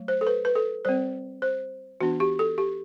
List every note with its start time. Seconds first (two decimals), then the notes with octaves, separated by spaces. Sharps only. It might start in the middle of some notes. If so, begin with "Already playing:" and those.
Already playing: F#3 A3
0.08 C5
0.21 A4
0.27 B4
0.45 B4
0.55 A4
0.85 G3 C4 C5
1.42 C5
2.01 E3 B3 D4 F#4
2.20 G4
2.39 A4
2.58 G4